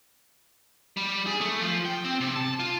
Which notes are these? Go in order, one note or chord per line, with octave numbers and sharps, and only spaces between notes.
G3
G#4
A3
F3
G5
C4
C3
A5
F4